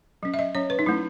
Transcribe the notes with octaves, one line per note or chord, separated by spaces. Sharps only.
F#3 C#4
E5
D#5
F#3 C#4 C#5
B4
D#4
F#3 A3 C#4 E4